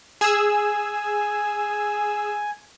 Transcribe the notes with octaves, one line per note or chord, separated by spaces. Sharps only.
G#4 G#5 E6